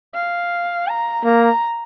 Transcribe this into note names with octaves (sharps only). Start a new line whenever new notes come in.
F5
A#5
A#3 A#5